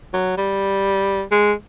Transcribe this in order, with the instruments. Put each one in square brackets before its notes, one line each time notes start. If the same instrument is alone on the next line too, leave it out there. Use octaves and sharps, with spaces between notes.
[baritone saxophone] F#3
G3
G#3